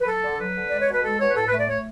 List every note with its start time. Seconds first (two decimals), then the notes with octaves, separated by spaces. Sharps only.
0.01 B4
0.07 F#3 A4
0.23 D3
0.39 F#3 B4
0.56 D3
0.69 G#3 D5
0.81 C#5
0.89 B2 B4
1.04 G#3 A4
1.20 B2 C#5
1.29 B4
1.36 A2 A4
1.48 B4
1.53 A3
1.59 D5
1.69 A3 C#5